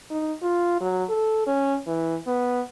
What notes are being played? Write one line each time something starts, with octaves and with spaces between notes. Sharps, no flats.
D#4
F4
F#3
A4
C#4
E3
B3